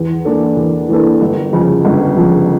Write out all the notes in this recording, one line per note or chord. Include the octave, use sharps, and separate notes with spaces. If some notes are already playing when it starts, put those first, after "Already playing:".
Already playing: E2
E3 A#3 D4 A4
E2
E3 A#3 D4 A4
G1
F2 C#3 F3
G1
F2 C#3 F3